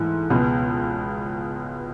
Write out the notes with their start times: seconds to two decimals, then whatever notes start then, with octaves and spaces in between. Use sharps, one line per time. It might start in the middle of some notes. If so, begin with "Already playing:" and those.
Already playing: G#2 E3 A3 E4
0.30 C#2 B2 G#3 B3